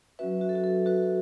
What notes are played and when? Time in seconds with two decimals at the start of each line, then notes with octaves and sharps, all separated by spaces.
0.19 F#3 C#4 F#4 B4 E5
0.41 F#4
0.49 A4
0.55 F#4
0.64 A4
0.86 F#4 B4